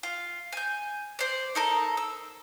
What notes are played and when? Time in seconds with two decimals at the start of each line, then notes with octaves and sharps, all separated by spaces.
0.03 F4
0.53 G#5 G6
1.19 C5 D5
1.55 D#4 A4 A#4
1.97 E6